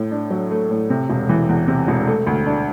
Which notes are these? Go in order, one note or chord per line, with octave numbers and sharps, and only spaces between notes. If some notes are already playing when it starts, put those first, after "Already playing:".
Already playing: A2 A3
D4
F#3
A3
A2
C3
E1
E3
E2
C3
E1
A3
D2
D4